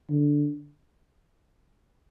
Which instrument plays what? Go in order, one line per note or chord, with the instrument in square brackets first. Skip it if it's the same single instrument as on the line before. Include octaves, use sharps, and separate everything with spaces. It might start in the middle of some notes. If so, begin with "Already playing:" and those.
[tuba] D3